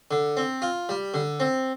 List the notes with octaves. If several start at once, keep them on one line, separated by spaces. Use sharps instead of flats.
D3
C4
F4
G3
D3
C4